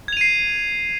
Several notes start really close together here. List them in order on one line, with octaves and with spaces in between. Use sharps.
G#6 F7 D#7 C7